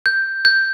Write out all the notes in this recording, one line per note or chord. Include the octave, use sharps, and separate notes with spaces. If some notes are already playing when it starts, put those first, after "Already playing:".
G6
G6